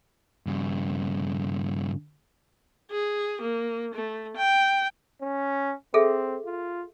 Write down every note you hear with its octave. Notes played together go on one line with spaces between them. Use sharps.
G2 C#3
G#4
A#3
A3
G5
C#4
C4 G#4 A4 E5
F4